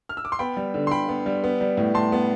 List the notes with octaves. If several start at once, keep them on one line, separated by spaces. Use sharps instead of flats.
F6
E6
D6
C6
B3 G5 B5
G3
D3
C6
D3 G5 B5
B3
G3
B3
G3
A2
A2 A5 C6
B3